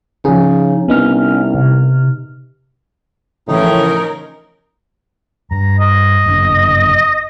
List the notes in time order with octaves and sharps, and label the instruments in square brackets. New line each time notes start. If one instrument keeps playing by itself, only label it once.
[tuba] C#3 [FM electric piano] F3 G#4 [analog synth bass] D#4
[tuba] C2 [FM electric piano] B3 D#4 F6 [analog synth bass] C#4
[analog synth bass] C3
[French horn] A2 [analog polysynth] C#3 E3 [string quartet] F3 C#4 A#4 [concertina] D#4
[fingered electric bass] G2 [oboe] A#5
[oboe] D#5
[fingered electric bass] G1 F#2 D4